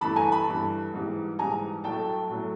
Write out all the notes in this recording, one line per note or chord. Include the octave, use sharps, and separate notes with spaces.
G2 E3 A3 A5 B5
G#5 A#5
A5 B5
G2 E3 A3
G#2 E3 G3
G#2 E3 G3 G#5 A#5
A2 F#3 A3 G5 A5
A2 F#3 A3